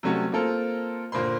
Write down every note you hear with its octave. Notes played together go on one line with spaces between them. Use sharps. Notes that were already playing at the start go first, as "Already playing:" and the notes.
C3 F#3 G3 A3 C#4 F#4
A#3 C4 F4 A4 A#4
G1 A#2 A#3 C5 B5 C6